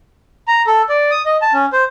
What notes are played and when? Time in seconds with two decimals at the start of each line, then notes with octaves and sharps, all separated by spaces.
0.48 A#5
0.67 A4
0.89 D5
1.11 D#6
1.26 D#5
1.42 A5
1.53 C#4
1.73 C5